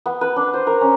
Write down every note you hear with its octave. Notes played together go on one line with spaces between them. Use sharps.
B3
B4
D4
C5
A#4
C#4